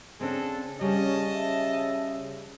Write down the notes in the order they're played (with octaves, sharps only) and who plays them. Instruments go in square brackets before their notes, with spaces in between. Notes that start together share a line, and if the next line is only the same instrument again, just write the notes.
[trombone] C#3 [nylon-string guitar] C4 D4 [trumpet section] G#4 A4
[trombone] C#3 [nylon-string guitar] G3 [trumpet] C#4 [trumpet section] D#5 A5
[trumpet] E5